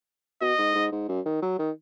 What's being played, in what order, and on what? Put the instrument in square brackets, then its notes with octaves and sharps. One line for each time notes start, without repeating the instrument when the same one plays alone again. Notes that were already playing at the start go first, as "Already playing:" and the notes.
[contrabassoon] B2 [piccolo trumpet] D#5
[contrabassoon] G#2
G#2
G#2
F#2
D#3
F#3
D#3